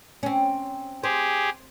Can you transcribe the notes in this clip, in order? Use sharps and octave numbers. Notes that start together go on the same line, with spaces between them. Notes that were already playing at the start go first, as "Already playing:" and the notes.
C4 C#4
G4 G#4 C5